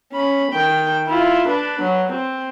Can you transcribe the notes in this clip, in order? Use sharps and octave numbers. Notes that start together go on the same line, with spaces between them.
C#4 B5
D#3 G5
E4 F4
D4 B4
F#3
C4